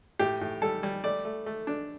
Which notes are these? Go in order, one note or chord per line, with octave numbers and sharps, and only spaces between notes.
A2 G4
A2
G3 A4
G3
A3 D5
A3
A3
D4